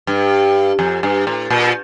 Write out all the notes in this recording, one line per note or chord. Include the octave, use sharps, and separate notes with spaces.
G2
F2
G2
A2
A#2